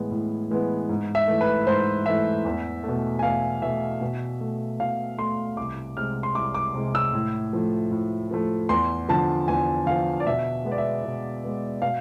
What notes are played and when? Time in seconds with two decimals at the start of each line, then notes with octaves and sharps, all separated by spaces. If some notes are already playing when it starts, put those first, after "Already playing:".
Already playing: A2 E3 G#3 B3
0.11 A2
0.51 E3 G#3 B3
0.89 G#2
1.15 E5
1.28 E3 A3
1.41 B4
1.67 G#2 C5
2.06 E3 A3 E5
2.45 E2
2.84 B2 A3
3.19 G#5
3.23 E2 F5
3.62 B2 A3 E5
4.01 B2
4.41 A3
4.79 B2 F5
5.18 A3 C6
5.57 C2 D6
5.96 C3 G#3 F6
6.23 C6
6.35 C2 D6
6.55 D6
6.74 C3 G#3
6.95 E6
7.13 A2
7.53 F3 A3
7.91 A2
8.31 F3 A3
8.69 E2 C6
9.09 D3 F3 A5
9.48 E2 G#5
9.86 D3 F3 F5
10.20 D5
10.26 B2 E5
10.65 G#3 B3
10.72 D5
10.78 E5
11.04 B2
11.44 G#3 B3
11.82 B2 F5